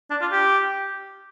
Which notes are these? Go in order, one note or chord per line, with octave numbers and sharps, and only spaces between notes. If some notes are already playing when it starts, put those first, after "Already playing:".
D4
F4
G4